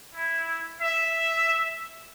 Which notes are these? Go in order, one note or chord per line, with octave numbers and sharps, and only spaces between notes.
E4
E5